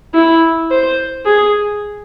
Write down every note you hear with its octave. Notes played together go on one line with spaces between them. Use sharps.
E4
C5
G#4